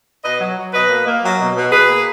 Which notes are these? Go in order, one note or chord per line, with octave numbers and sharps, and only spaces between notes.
B2 B4 D#5
F#3
F#3
B2 B4 D#5
A#3
A#3
F#3
B2
B2
B2 G#4 B4
A#3